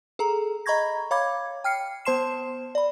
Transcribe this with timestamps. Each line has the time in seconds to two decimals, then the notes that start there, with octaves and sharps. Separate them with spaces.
0.19 G#4 A4 A#5
0.66 D#5 A#5 B5 C#6 G#6 A#6
1.11 C#5 F5 B5 D6 G#6
1.64 G5 F6 C7 C#7
2.05 B3 C5 A5 C6 C7 E7
2.75 D5 B5